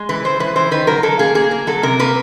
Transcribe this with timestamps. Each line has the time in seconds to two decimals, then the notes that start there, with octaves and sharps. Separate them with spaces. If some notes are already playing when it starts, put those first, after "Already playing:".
Already playing: G#3
0.09 E3 B4
0.25 E3 C5
0.40 E3 B4
0.55 E3 C5
0.71 D#3 B4
0.87 F#3 A#4
1.03 F#3 A4
1.19 A#3 G#4
1.35 A#3 G#4
1.51 A#3
1.67 F#3 A4
1.83 C3 A#4
1.99 A#3 B4